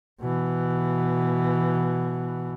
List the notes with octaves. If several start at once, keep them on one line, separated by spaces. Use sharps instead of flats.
B2 E3